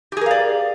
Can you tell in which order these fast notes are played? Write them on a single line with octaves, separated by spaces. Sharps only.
G4 G#4 A#4 F5 D5